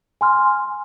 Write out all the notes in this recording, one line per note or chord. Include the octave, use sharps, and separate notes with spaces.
G#5 C6 F6